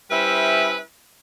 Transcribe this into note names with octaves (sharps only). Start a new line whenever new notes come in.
G3 C#4 E4 B4 C5 E5